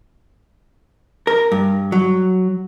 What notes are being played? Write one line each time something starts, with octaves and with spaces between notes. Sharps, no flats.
A#4
G2
F#3